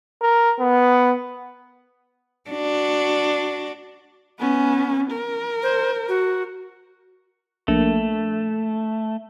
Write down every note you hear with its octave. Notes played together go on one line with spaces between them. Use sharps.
A#4
B3
D4 F#4
B3 C#4
A#4
C5
F#4
A#1 A3